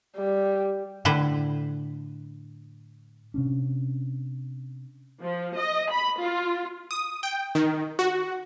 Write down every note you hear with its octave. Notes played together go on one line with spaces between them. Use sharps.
G3
A2 D3 B4 C5 G5
C3 C#4 D4
F3
D#5
B5
F4
D#6
G5
D#3
F#4